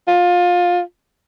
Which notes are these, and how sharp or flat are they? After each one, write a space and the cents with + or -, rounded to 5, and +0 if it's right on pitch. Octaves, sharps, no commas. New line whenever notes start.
F4 +20